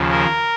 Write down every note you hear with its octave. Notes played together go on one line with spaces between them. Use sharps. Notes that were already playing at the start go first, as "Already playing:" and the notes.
Already playing: D#2 C#3 F3
A#4